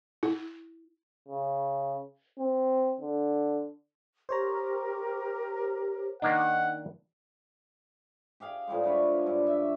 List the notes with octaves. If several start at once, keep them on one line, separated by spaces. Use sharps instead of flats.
E4
C#3
C4
D3
G4 A#4 C5 C#5 A#5
D#3 A#3 D4 D#4 F#5
G4 G#4 F5 G5
A2 F3 G3 G#3
G#3 D4 B4 C#5
G2
E5